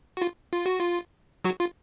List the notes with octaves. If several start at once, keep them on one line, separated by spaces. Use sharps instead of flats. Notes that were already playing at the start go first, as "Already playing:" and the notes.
F#4
F4
F4
F#4
F4
F#3 F#4
F4